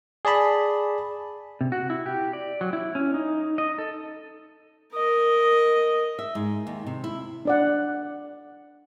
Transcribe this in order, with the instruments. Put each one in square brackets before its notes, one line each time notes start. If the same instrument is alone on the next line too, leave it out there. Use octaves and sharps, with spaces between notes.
[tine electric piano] G#4 D5 A5 B5
[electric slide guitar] C3
F#4
E4
G4
D5
F#3
E4
C#4
D#4
D#5
A4
[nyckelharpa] A#4 D#5
[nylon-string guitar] E5
G#2
D#2
C3
E4
[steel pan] D4 D5 F#5